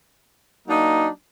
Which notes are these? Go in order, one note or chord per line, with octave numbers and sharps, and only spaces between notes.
F#3 A#3 D4 D#4